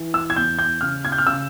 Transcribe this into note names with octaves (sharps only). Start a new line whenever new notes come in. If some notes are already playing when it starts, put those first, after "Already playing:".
Already playing: E3
E6
G#6
E2 G6
G6
C#3 F6
G#6
G6
F6
C#3 E6